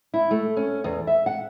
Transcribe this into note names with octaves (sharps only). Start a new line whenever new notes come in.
E4
A3
C#4
E2
E5
F#5